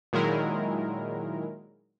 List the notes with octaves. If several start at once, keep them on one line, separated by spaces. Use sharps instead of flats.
A#2 D#3 F#3 G#3 E4 A#4